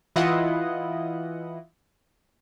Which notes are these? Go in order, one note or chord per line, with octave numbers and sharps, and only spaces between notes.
E3 E4 F4 D#5 F#5